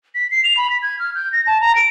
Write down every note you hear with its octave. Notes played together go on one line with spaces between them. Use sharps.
B6
C7
F7
B5
B6
G#6
F6
G6
A#6
A5
A#5
D7